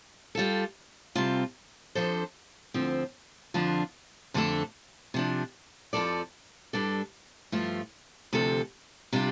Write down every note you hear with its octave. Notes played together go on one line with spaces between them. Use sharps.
G3 F4 A4
C3 G3 C4 F4 A4
F2 F3 D4 A4 C5
D2 D3 F3 C4
F2 D3 F3 D4 F4
F2 D3 A3 D4 A4
C3 F3 D4
F2 F3 C4 A4 D5
G2 G3 D4 A4 D5
G2 F3 A3 F4
D2 C3 F3 D4 A4
C3 G3 D4 F4